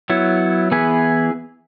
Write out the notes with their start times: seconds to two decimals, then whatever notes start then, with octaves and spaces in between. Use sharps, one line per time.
0.10 F#3 B3 E4 C#5
0.72 E3 B3 E4 G#4 B4